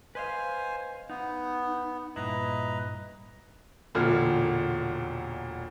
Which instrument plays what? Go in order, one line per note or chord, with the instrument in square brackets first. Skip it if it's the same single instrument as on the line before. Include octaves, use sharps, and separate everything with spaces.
[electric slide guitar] B4 D#5 F5 [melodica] C5 G#5
[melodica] B3 [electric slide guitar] D#4
[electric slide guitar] G2 A#2 E4 [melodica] B4 D#5 A#5
[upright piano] E1 A#2 D3 F6